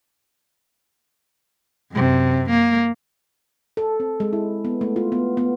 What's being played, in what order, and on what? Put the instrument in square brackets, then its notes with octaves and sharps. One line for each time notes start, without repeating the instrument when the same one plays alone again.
[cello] F#2 C3
A#3
[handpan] A4
C4
G#3
E4
B3
A3
F4
B3
B3